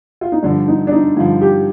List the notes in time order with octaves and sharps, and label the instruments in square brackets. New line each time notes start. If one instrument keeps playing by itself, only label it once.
[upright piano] F4
D#4
[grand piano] G2 D3 F3 [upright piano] D4
[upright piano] D#4
D4
D#4
[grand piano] G2 D3 F3 [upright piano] F4
[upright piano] G4